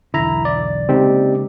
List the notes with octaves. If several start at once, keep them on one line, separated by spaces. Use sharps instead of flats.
B1 E2 D3 E4 E5 A#5
D5
C#3 G#3 A#3 C4 D#4 G4